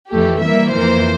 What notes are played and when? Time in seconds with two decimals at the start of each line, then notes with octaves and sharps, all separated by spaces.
0.10 F2 E3 A3 G4
0.42 E3 G3 A#3 E5
0.74 F2 E3 A#3 C5